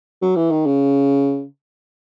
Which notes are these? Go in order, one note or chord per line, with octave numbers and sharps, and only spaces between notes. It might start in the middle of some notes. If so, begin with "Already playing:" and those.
F#3
E3
D#3
C#3